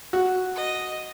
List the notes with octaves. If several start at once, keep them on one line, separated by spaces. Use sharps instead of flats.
F#4
D#5